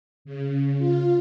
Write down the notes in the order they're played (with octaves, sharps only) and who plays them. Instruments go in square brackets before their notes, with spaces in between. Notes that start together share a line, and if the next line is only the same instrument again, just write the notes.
[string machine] C#3
F4